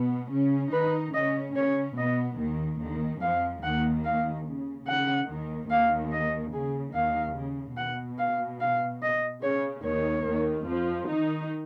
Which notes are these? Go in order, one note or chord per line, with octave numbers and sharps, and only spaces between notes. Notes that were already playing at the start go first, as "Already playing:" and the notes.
Already playing: B2 B3
C#3 C#4
D#3 D#4 B4
C#3 C#4 D#5
C#3 C#4 C#5
B2 B3 D#5
D#2 D#3
D#2 D#3
F2 F3 F5
D#2 D#3 F#5
F5
C#3
C#3 F#5
D#2 D#3
D#2 D#3 F5
D#5
C#3 G#4
D#2 D#3 F5
C#3
B2 F#5
F5
F5
D#5
C#3 C#5
D#2 D#3 C#5
D#2 D#3
F2 F3
D#3 D#4